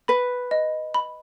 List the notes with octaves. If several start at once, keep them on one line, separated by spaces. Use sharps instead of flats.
B4 B5
D#5
B5